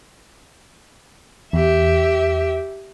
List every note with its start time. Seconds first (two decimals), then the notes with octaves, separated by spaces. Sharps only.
1.53 E2 G4 E5